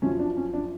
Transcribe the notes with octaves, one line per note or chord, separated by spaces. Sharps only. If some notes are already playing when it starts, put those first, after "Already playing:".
F#2 F3 C#4
D4
C#4
D4